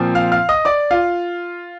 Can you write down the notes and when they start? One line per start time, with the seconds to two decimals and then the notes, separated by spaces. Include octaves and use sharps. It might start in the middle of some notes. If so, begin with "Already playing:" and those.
Already playing: A#2 F3 C4
0.15 F5 F6
0.32 F5 F6
0.49 D#5 D#6
0.65 D5 D6
0.91 F4 F5